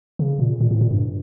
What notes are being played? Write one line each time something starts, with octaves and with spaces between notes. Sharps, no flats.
C#3
A#2
A#2
A2
A#2
G2